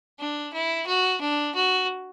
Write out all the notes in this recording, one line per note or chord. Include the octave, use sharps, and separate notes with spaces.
D4
E4
F#4
D4
F#4